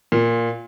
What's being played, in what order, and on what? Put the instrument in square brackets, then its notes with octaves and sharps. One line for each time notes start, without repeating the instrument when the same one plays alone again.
[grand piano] A#2